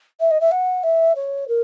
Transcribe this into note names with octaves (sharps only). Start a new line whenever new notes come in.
E5
D#5
E5
F#5
E5
C#5
A#4